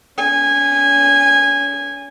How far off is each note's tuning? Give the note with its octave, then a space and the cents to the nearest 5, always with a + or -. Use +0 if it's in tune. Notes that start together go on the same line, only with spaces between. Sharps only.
C#4 +40 G#5 -15